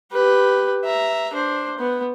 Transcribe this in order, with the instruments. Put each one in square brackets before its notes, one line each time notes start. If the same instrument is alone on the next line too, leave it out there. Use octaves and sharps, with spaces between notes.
[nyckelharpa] G4 B4
E5 A#5
D4 C5
B3